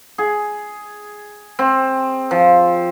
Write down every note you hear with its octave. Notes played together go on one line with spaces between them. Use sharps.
G#4
C4
F3